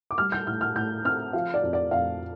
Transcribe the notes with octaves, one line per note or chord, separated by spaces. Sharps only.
D6
G3 F6
G6
A2 F6
F6
A2 G6
C4 F6
F3 F5
D5
F2
D5
F2 F5